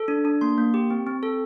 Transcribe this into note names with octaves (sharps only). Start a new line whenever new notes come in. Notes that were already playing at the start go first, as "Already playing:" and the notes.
Already playing: A4
D4
D4
A#3 C6
A#3
G4
C4
C4
A4